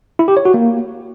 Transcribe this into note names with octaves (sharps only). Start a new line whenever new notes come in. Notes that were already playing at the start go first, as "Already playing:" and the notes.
E4
G4
C#5
F#4
A#3